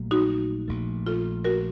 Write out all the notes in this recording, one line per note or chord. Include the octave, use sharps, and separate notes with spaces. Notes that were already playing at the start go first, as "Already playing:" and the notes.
Already playing: A#1 A#2 F#3 A3
D#4 F#4
A#1 A#2 F3 A3
F4 A4
F#4 A#4